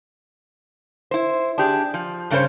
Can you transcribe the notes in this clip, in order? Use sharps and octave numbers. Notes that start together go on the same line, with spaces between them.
E4 C5
D4 G4 G#4
F3
G2 C#3 A3 B3 C5 C#5